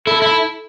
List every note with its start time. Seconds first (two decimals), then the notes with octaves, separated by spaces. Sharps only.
0.06 E4 A4
0.22 E4